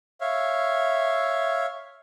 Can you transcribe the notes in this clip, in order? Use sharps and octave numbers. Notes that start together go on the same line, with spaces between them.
C#5 E5 F5